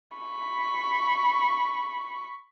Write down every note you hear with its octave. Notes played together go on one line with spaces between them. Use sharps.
B5 C#6